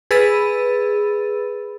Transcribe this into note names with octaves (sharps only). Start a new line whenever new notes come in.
G#4 B4 B5 E6 A6 D#7